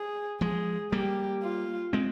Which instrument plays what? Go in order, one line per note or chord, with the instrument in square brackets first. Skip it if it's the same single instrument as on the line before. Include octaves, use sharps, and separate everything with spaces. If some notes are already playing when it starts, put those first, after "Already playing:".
Already playing: [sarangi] G#4
[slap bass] F3 G#3 [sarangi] G#4
[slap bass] G3 A#3 [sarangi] G4
[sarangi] F4
[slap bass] G#3 C4